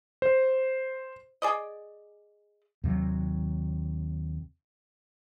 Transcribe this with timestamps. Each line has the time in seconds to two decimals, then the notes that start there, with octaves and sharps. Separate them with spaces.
0.22 C5
1.42 G#4 D5 D#5
2.84 D#2 C3 F#3